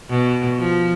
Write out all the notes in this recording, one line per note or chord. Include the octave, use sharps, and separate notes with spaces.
B2
F3